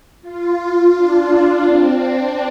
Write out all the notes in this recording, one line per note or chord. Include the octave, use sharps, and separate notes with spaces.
F4
D4
C4
D4